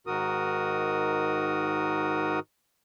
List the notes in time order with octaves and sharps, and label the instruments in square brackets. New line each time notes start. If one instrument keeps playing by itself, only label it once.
[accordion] G#2 D#3 F#4 A#4 D#6